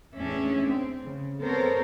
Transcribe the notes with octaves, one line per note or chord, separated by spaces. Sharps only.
E2 A2 C#4 D4 G#4 E5
C4
C#3
B3 C4 A4 A#4 C5 C#5